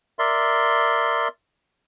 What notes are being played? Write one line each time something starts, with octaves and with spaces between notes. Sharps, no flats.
A#4 D5 E5 C6